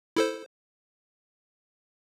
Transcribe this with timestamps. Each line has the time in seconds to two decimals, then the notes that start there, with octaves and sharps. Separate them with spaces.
0.16 E4 A4 C5